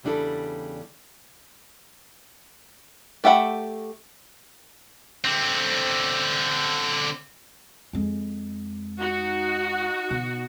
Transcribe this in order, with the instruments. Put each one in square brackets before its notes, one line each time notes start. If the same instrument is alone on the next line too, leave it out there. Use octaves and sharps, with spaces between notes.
[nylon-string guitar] E2 C#3 G3 D4 E4 A4
[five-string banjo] A3 G4 E5 F#5 B5
[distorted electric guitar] D3 C4
[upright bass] F2 G#3
[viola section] D#4 F#4
[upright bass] B2